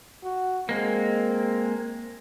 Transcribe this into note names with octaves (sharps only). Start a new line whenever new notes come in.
F#4
G#3 A#3 C4